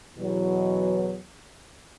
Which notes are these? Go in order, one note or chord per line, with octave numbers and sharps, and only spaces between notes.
E2 B2 F#3